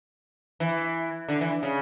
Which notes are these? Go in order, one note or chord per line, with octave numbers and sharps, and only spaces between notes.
E3
D3
E3
C#3